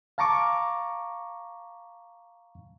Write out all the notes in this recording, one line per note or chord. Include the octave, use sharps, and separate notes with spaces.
F5 A5 A#5 C#6 D6